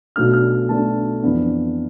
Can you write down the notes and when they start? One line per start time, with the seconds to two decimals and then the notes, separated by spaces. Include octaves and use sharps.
0.16 B1 B2 A3 D4 F6
0.33 F6
0.69 B1 B2 A3 D4 A5
1.22 F2 E3 B3 D4